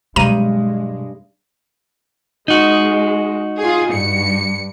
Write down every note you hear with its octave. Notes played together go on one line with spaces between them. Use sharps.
G2 B2 F#3 G#3 A#5 D#7
G#3 D#4 F#4
F4 G#4
G2 C#7